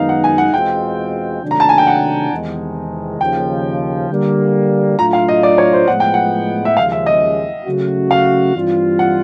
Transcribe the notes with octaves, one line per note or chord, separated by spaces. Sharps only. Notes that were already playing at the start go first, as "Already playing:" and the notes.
Already playing: F#2 D#3 G#3 B3 D#4 F5
F#5
G#5
F#5
E2 B2 G#3 C4 F4 G5
C3 D#3 F#3 A3 D4
A#5
A5
G#5
G5
F#5
E2 C3 D#3 G#3
D#2 C#3 F3 G5
D3 G3 A#3
A2 F#3 A3 D4 F4 A#5
F5
D#5
D5
C#5
C5
A2 F3 G#3 B3 F#5
G5
F#5
E5
D#2 C#3 F3 G#3 F5
E5
D#5
C#3 F#3 A3 C#4 F#4
F5
G2 E3 G3 C4 F4
F#5